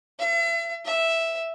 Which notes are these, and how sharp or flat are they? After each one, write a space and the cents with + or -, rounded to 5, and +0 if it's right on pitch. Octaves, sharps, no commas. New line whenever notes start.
E5 +40
E5 +0